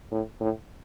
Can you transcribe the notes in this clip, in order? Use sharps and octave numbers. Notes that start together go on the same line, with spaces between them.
A2
A2